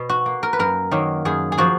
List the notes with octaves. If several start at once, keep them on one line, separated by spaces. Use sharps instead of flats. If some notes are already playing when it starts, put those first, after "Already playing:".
Already playing: B2
F#4
A#3
A#4
B4
F#2 A#4
D#3 F#3 A#3
F#2 G#4
G#4
F3 A#3 F#4